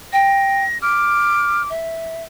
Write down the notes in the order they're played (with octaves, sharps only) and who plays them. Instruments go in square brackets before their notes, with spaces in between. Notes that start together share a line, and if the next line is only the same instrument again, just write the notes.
[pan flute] G5 [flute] A#6
[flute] D6 [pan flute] F6
[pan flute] E5